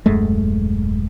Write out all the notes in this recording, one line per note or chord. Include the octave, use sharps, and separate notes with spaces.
D#1 F#2 G#3 A3